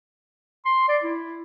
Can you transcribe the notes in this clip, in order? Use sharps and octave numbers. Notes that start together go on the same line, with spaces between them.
C6
D5
E4